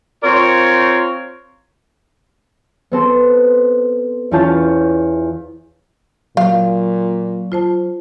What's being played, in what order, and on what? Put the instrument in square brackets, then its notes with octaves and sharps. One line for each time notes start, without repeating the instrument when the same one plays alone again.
[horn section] C4 F4 A#4 C5 C#5
[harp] B3 C4 A4
E2 C#4 F4 A5 G6 A6
[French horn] A#2 [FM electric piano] F#3 [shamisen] F5
[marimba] F4 C5 A5